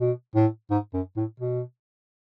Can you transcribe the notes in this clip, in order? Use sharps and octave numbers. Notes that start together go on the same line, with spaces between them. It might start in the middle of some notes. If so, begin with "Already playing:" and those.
B2
A2
G#2
F#2
A2
B2